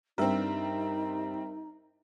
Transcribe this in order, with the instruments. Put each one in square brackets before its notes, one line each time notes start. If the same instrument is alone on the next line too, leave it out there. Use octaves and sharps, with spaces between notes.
[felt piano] G2 [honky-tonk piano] G3 C4 [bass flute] D#4 [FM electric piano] A#4 E5